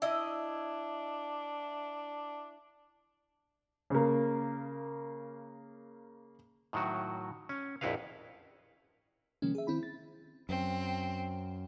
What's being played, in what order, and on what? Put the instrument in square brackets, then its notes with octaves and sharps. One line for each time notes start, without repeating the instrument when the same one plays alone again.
[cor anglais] D4 [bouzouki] E4 D#5
[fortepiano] C#3 A#3
[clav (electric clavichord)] A2 D#3 F#3 F#4
C#4
A#1 F2 E4 F#4 B4 F5
[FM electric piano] C3 D#3 F3 G#3 A#3 C#4
G#4 E5
D#3 C4 E4 B5
A6
[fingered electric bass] F#2 [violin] C4